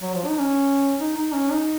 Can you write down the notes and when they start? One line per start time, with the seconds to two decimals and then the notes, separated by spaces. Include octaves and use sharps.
0.02 F#3
0.14 F3
0.27 D#4
0.39 C#4
1.00 D#4
1.17 D#4
1.33 C#4
1.50 D#4